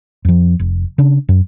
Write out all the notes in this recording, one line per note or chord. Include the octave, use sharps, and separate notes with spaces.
F2 F3
F1
C#3 D4
F#2